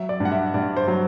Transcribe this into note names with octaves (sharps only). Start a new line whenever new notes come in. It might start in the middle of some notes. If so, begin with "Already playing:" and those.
Already playing: F#3 E5
D5
G2
F#5
E5
G2 D5
C5
F#3